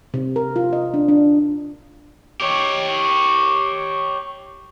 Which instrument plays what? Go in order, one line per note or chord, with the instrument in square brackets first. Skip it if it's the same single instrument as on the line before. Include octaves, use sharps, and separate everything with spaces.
[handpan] C3
A#4
F4
D#5
D4
D4
[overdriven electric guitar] G4 C#5